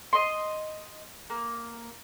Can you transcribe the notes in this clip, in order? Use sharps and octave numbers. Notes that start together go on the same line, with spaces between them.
D#5 C6
A#3